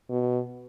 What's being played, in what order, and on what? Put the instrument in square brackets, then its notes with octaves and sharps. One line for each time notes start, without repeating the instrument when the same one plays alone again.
[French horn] B2